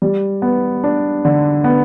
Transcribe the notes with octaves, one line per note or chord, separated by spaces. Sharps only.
G3
B3
D4
D3
B3